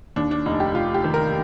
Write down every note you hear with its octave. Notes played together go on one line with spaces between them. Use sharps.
D#2 D4
D4
F1 D#4
G4
F1 F4
G4
D#3
A#4